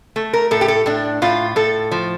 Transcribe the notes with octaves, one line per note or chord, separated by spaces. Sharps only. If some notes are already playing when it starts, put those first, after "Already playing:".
A3
A#4
A2 A4
G4
A4
A2 D4
A2 F4
A2 A4
F3